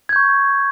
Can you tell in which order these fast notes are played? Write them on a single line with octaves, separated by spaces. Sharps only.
G#6 G6 C#6